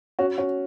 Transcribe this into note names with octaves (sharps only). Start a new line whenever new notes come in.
C#4 F#4
C#4 F#4